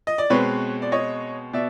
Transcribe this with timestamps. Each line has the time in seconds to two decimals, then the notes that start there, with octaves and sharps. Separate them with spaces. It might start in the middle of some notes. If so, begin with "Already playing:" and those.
0.07 D#5
0.18 D5
0.30 B2 G#3 C4 B4 C#5
0.82 D5
0.92 C#5 D#5
1.53 B2 D5 E5